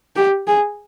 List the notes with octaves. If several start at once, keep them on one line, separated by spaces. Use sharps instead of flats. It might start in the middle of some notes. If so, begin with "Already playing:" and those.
G4
G#4